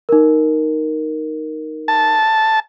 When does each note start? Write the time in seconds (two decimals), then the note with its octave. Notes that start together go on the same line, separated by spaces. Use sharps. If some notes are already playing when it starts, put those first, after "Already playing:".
0.09 D#4 A#4
1.88 A5